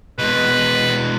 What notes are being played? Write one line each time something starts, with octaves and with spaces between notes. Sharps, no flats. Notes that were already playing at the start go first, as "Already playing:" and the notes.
B2 G#3 B4